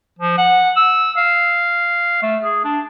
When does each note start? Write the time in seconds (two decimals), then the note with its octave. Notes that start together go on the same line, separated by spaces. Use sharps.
0.19 F3
0.38 F#5
0.76 E6
1.17 F5
2.23 A3
2.43 G#4
2.65 D4